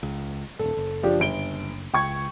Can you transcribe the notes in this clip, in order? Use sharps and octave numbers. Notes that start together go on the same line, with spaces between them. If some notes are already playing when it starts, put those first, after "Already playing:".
C#2
D#1 G#1 A4
F#1
F3 D4 G4
G1 D7 G7
C#2 G5 C#6 G#6